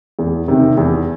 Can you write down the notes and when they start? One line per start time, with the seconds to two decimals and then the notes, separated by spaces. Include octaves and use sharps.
0.19 E2
0.48 C3 D#3
0.77 E2